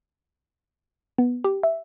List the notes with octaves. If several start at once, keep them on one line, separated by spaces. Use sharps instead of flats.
B3
G4
E5